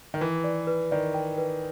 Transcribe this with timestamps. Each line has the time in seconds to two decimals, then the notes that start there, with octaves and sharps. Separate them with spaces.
0.14 D#3
0.21 E3 B4
0.44 D5
0.67 B4
0.91 D#3 D5
1.14 G5
1.38 B4